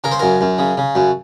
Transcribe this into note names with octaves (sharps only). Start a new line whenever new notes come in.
C#3 A#4
C5
F#2 A#4
F#2
C#3
C#3
F#2